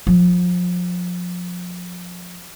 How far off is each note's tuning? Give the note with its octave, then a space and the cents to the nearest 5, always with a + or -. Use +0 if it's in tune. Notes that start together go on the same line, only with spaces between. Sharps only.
F3 +30